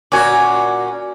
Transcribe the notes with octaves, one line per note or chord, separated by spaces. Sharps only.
A#2 C#4 F#4 D5 G#5